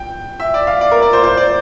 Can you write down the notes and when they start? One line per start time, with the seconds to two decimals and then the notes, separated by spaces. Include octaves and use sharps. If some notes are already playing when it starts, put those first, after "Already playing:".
Already playing: G5
0.40 E5
0.54 D5
0.67 F5
0.81 D5
0.91 A#4
1.02 D5
1.13 C5
1.23 C5
1.37 D5